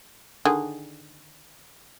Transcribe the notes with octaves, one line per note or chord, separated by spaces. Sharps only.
D3 D#3 G#4